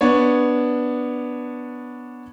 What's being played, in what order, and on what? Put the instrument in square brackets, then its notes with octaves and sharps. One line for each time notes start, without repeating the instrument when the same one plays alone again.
[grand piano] B3 D4 C#5